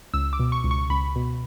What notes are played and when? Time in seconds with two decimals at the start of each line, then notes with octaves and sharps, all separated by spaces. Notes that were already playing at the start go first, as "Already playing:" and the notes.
0.14 C#2 E6
0.33 D6
0.40 B2
0.52 C#6
0.64 C#2
0.71 C#6
0.90 C#2 B5
1.16 B2